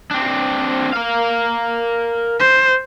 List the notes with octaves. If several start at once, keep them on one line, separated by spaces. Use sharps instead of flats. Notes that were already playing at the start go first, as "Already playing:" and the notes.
C4 D4
A#4 F5
C5